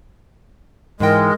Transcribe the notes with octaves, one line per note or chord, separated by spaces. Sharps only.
G#2 E3 G#3 A#4 G5